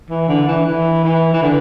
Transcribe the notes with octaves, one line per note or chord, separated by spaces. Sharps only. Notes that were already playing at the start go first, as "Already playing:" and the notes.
E3
D3
E3
E3
E3
E3
D3